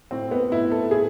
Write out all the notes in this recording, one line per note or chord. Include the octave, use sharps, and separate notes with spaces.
A2 C4
B3
A2 E4
A4
A2 G#4